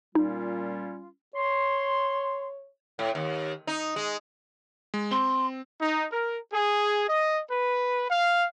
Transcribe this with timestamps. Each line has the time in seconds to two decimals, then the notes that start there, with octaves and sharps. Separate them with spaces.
0.15 A#2 G3 C#4 D#4 F4
1.35 C#5 C6
2.99 A2
3.15 D#2
3.67 D#4
3.96 G#3
4.94 G#3
5.11 C4 C6
5.81 D#4
6.12 A#4
6.52 G#4
7.09 D#5
7.51 B4
8.10 F5